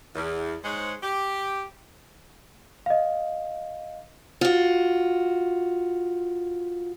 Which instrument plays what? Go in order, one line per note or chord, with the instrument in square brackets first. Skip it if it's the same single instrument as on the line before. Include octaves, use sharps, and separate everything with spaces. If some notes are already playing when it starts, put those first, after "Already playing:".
[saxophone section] E2
G#2 G#3 C5 C#5 F#5
G4
[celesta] D#5 F5
[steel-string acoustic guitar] F4 F#4